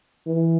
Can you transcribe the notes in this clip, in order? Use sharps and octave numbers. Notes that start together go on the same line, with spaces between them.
E3